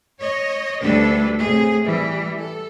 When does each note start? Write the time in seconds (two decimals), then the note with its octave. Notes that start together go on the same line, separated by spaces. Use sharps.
0.20 C#5 D#5
0.81 D2 G3 D4 A4 B4
1.39 A2 C3 G#4
1.85 E3 G3 E4
2.38 A4